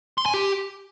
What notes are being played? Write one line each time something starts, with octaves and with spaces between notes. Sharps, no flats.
C6
G#5
G4